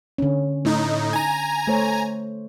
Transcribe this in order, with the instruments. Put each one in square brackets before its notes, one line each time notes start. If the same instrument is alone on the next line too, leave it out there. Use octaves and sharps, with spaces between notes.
[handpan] D3 C#4
[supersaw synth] A2 D#4
G#5 A#5
[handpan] A3 C5 C#5